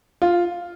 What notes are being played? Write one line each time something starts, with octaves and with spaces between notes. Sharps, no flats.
F4